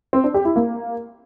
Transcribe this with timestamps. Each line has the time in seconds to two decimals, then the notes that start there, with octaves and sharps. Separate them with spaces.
0.13 C4
0.24 D4
0.34 G4
0.45 E4
0.56 A#3